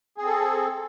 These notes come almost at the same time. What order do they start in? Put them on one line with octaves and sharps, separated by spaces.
G#4 C4 A4